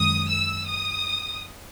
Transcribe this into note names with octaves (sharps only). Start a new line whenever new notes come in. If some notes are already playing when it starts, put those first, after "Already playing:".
Already playing: F#2 D#3 G#3 D#6
E6
D#6